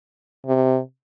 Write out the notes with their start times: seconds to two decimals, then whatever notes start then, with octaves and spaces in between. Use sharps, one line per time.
0.46 C3